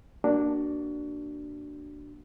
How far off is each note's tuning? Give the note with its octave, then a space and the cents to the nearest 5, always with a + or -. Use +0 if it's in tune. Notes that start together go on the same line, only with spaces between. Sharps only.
A#3 +0 D4 +0 F#4 +25